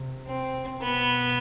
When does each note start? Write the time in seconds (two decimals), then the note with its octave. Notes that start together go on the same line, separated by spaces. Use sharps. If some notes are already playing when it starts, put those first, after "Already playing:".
Already playing: C3
0.27 C4
0.82 B2 B3